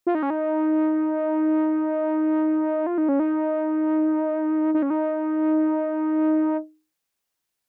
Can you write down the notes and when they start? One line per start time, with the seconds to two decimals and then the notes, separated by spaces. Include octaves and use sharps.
0.07 F4
0.15 D#4
0.23 C#4
0.30 D#4
2.87 F4
2.98 D#4
3.09 C#4
3.20 D#4
4.74 D#4
4.82 C#4
4.90 D#4